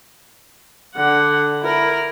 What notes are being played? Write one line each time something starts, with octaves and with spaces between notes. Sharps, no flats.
D3 F#5
E4 A#4